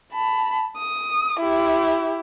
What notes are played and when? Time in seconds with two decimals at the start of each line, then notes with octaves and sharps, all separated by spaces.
0.13 A5 B5
0.77 D#6
1.40 E4 G4